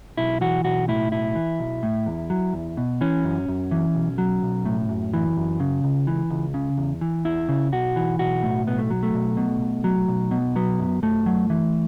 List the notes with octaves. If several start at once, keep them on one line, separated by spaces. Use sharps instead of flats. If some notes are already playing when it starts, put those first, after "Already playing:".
B1 E4
E3 F#4
B1 F#4
A2 E4
B1 E4
E3
B1
A2
E2
F#3
E2
B2
E3 C#4
F#2
F#2
E3
B1
F#3
B1
A2
F#2
E3
F#2
C#3
C#2
E3
C#2
C#3
E2
E3
E2 E4
C#3
B1 F#4
E3
B1 F#4
A2
B1 B3
A3
F#3
A3
B1
B2
B1
F#3
B1
B2
F#3 B3
F#2
F#2 A3
F#3
E3